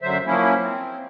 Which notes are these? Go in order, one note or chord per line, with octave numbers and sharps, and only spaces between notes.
F#2 D3 F#3 C5 E5
F3 F#3 A#3 C#4 E4
C4